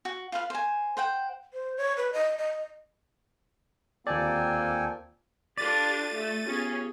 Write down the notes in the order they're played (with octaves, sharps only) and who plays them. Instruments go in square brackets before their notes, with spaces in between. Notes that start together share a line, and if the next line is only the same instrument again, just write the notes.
[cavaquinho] F#4
F4 B4 F5
C5 G#5
C5 F#5 G5
[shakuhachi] C5
C#5
B4
D#5
D#5
[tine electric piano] D#2 D5 [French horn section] A#3 C4 F4 [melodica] A4 G5 G#5
[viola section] D4 F4 G4 [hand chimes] A4 B6 [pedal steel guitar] D5 [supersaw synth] A6 D#7
[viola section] A3
[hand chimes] B3 F4 G4 [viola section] C#4 G#4